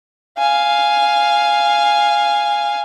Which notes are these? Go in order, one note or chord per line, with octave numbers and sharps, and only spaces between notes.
F5 G#5